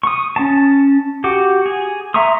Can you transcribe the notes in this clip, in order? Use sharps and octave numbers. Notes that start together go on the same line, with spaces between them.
C#6 D#6
C#4 A5
F#4 G4 D6
G#4
E5 A#5 C6 C#6 D#6